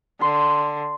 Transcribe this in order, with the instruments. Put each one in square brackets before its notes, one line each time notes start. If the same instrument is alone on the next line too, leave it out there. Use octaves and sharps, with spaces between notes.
[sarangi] D3 [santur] C6